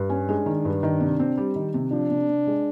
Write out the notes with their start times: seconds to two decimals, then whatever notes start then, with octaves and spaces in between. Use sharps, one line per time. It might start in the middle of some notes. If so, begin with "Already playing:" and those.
Already playing: G2
0.10 C#4
0.28 G#3 D4
0.46 D#3
0.65 G2
0.83 D#3
1.00 C3
1.19 C4
1.37 G3
1.55 D#3
1.74 C3
1.92 F3 D4
2.11 C3
2.28 C3
2.47 G#3